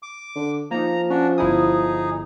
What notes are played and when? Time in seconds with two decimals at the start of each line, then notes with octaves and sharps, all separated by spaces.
0.03 D6
0.35 D3
0.71 F3 A#3 D#4 A#5
1.10 C#4 D4 F#4
1.38 G1 D#4 E4 G#4 D#6